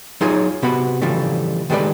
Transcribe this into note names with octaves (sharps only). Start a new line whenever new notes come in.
F#3 D#4 F4 G#4 C#5
C3 B3 F#4 B5
C#3 E3 F3 G3 A3
D#3 G#3 A3 G4 B4 D5